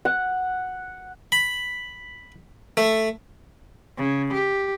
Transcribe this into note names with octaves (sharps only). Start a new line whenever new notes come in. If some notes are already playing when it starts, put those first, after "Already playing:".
F#5
B5
A3
C#3
G4